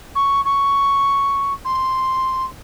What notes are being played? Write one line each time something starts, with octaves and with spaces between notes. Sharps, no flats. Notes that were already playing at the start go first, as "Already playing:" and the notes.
C#6
C#6
C6